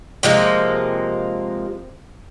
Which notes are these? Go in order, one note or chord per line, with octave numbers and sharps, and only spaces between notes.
C3 F3 G#3 A#3